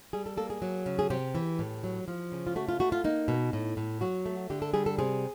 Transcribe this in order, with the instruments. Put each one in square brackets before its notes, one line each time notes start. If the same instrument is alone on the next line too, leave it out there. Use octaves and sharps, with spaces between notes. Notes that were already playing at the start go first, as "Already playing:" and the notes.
[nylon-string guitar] G3 G#4
A4
A#3 A4
G#4
F#3
C#3
G#4
C3 G4
E3
A2
F#3
F3
C#3
F4
A3 F#4
F4
A3 F#4
F4
A#3 D#4
B2
A2
A2
F#3 F#4
A3
D3 G4
A4
G3 G#4
A4
C3 G#4